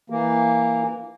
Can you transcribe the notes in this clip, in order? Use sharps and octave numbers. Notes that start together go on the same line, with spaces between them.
E3 A#3